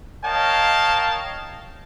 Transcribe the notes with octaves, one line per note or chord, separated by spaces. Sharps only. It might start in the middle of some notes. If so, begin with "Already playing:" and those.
A#4 C#5 D#5 F5 G5 A5